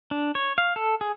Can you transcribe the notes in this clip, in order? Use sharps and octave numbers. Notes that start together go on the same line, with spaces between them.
D4
C#5
F5
A4
G#4